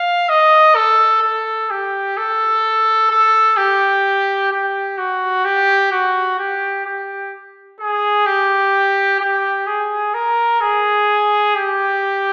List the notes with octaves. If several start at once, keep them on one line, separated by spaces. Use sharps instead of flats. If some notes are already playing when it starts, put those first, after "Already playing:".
Already playing: F5
D#5
A4
A4
G4
A4
A4
G4
G4
F#4
G4
F#4
G4
G4
G#4
G4
G4
G#4
A#4
G#4
G4